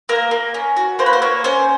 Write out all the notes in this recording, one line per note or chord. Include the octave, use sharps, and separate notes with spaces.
A#3 A#4
A#3
C#4
F#4
A#3 C5
B4
C5
A#3 C#5
C#4 C5